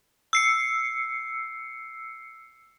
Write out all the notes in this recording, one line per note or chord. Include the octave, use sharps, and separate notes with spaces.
E6 C7 C#7